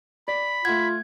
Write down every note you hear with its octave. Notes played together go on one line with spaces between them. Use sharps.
D5 B5
A3 F4 F#5 G#6